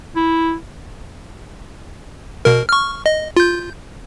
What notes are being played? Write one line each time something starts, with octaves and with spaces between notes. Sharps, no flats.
E4
B2 A#4
C#6 F6
D#5
F4 G6